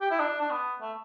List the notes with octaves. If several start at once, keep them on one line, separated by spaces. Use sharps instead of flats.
G4
E4
D4
D4
B3
A3